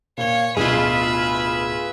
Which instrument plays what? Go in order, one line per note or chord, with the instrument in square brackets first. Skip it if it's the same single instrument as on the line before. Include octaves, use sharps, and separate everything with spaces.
[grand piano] A#2 G7 [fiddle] C#5 [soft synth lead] F5
[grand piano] D1 B2 [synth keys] F4 G#4 [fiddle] B4 E5 [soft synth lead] F6